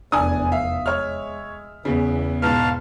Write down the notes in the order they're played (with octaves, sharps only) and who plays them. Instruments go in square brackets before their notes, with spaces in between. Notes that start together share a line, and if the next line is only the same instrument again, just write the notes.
[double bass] F1 E2 [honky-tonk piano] D4 G#5 [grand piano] D#6
[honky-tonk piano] E5 [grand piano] F5
[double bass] G#3 [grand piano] C#5 F6
[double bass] E2 E3 [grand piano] C#3 B3
[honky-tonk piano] G#2 B2 [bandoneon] F5 A5 F6